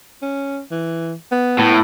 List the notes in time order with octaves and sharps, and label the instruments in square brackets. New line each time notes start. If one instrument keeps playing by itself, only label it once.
[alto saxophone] C#4
E3
B3
[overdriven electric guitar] A2